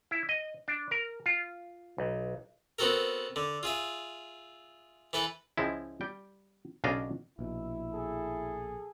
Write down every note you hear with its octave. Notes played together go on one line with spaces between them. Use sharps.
E4
D#5
D4
A#4
F4
B1
B3 C4 F#4 A4 A#4
D3
F4 G#4 E5
E3 A4 B4
C#2 F3 G#3 E4
G3 G5
B1 C#3 D4 D5 D#5 F5
A#1 B2 E4
G#4 A4